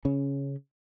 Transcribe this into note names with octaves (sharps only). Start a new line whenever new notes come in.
C#3 C#4